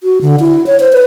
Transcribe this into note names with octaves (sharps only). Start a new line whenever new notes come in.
F#4
D3
E4
C#5
C5
B4